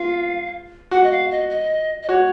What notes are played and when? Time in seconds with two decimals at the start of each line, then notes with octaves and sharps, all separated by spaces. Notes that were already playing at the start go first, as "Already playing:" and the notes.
Already playing: F4 F5
0.91 F#4 F#5
1.04 D#5
1.12 F5
1.31 D#5
1.50 D#5
2.03 D#5
2.09 F#4 C#5